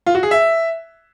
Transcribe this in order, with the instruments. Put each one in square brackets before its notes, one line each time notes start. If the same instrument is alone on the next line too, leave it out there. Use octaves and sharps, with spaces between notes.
[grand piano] F4
F#4
G#4
E5